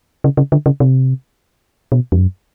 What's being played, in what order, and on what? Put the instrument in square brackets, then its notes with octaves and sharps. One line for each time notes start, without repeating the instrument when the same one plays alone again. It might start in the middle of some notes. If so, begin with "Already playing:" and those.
[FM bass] C#3
C#3
D3
C#3
C3
B2
F2
F#2